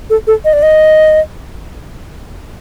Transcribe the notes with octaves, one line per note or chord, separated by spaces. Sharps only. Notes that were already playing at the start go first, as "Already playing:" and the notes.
A4
A4
D#5
D5
D#5